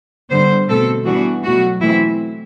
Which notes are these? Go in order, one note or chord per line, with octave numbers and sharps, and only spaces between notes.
D3 G3 B3 C5
B2 A3 C4 A4
E3 G3 B3 D4 F#4
B2 F#3 A3 F#4
E3 A3 C4 E4